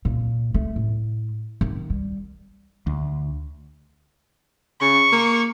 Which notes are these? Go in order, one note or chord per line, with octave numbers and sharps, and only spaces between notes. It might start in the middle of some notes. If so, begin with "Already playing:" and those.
A#2
A3
A2
D#3
G3
D2
C#3 C#6
A#3